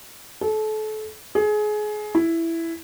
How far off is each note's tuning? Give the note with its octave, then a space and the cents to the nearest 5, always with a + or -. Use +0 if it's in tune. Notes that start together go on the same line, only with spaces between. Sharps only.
A4 -30
G#4 +25
E4 +5